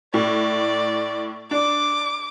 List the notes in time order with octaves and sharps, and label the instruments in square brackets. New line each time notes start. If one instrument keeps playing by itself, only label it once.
[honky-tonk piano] A2 [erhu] D5
[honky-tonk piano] D4 [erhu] D6